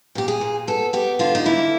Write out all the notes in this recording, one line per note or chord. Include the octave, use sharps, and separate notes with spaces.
A#2 G4
G#4
A#2
B3 A4
B3 G4
D3 F4
D#4
A#3 E4